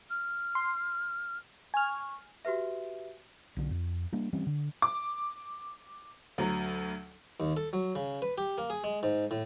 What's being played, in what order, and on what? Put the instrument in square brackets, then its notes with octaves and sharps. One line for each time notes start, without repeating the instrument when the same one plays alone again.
[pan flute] F6
[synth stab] C6
[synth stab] G#5 F6 [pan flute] C#6
[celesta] F#4 G4 B4 E5
[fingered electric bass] B1 D3
F2
G3 A#3 D4
E3 G3 C4 C#4
D3
[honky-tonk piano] D6
D2 F#3
[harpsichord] D#2
A4
F#3
C#3
B4
G4
A#3
G#4
G#3
G#2
A2